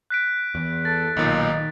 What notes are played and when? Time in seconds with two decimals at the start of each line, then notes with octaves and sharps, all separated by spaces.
0.10 F#6 B6 D7
0.55 E2
0.85 A4 A6
1.17 B1 A#2 D#3 D#4